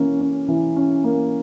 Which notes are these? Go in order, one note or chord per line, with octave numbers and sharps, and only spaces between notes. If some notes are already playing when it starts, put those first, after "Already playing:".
Already playing: E3 A#3 C#4
C#4
E3
C#4
A#3